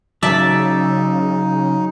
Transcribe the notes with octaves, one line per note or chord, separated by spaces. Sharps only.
C#3 F#3 D#4 A#4 D5 E5 A5